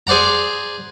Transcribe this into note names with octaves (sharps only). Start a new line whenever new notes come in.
G#4 C5 D5 F#5 A#5